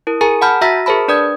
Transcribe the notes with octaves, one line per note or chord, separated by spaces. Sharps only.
E4 A#4
G#4 A#4 G#5 A#5
F#5 A5 B5 F6 G6
F#4 E5 A#5 E6 A#6 B6
G#4 A#4 C5 A5 B5
D4 B4 D5 D#6 G6 G#6